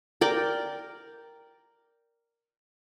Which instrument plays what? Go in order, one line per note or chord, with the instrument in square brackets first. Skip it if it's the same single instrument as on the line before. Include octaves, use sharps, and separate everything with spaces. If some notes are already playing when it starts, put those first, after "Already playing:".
[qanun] A#4 D5 G5